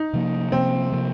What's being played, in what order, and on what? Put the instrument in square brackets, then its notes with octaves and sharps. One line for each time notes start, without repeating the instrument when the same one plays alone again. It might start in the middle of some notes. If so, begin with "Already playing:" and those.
Already playing: [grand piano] D#4
[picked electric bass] C3 F3 A#3
[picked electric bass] C3 F3 A#3 [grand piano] C4
[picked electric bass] C3 F3 A#3